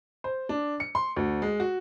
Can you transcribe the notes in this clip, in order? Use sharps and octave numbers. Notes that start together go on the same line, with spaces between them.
C5
D4
C#7
C6
D2
G#3
F#4